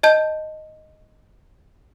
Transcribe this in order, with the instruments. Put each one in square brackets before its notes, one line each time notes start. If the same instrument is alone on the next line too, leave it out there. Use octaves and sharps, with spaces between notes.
[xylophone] D#5 A5 G6